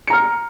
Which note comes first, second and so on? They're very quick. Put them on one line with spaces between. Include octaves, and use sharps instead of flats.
C#7 A#5 F6